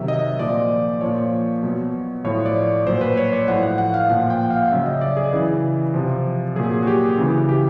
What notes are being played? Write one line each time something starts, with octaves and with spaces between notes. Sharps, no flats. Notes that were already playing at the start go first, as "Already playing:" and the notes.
Already playing: C3 D#3 F#3 E5
D#5
A#2 F3 D5
A#2 F3 C#5
B2 F#3
A2 F3 C#5
D5
A#2 F#3 C5
B4
C#5
D5
A2 F3 F#5
F#5
F#5
F5
A#2 F3 F#5
G5
F5
C#3 F#3 E5
D#5
D5
G#4
C#3 E3
C3 F3
A#2 F#3 G#4
F#4
G4
C#3 E3
G4